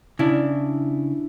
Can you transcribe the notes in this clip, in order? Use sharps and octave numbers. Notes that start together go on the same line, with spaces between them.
C#3 D4 E4